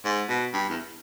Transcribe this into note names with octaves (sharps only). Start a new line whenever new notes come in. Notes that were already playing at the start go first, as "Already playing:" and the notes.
G#2
B2
G2
E2